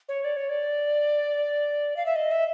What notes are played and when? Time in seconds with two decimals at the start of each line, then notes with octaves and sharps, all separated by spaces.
0.09 C#5
0.24 D5
0.36 C#5
0.49 D5
1.96 F5
2.06 E5
2.16 D#5
2.31 E5